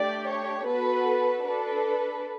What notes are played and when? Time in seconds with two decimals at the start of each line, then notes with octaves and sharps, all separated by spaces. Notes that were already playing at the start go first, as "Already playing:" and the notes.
Already playing: A3 D4 G4 D5
0.26 C#5
0.65 B3 F#4 A4 B4
1.43 D4 A4 B4